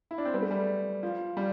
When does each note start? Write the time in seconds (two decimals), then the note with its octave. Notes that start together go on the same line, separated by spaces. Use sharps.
0.11 E4
0.18 D4
0.25 C4
0.34 G3 B3
0.42 A3
0.51 G3
1.03 F3
1.37 G3